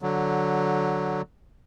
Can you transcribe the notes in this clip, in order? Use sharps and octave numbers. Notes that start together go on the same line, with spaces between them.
D3 F#3